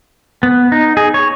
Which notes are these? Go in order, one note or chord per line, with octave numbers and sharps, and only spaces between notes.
B3
D#4
G#4
C#5